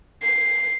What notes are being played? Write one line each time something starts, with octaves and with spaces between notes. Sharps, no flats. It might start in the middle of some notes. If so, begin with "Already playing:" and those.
C7